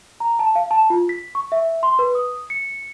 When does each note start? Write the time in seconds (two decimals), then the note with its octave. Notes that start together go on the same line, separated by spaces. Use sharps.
0.20 A#5
0.39 A5
0.55 F5
0.71 A5
0.90 F4
1.09 B6
1.35 C#6
1.52 E5
1.83 C6
1.99 B4
2.15 D#6
2.50 C#7